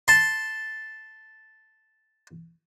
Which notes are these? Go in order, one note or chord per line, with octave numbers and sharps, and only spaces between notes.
A5 C6